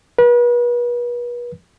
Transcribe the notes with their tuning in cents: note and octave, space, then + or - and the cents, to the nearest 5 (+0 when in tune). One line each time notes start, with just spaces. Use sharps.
B4 -40